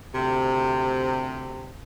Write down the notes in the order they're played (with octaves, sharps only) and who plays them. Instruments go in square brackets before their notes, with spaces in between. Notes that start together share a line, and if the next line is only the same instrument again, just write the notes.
[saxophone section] D2 C3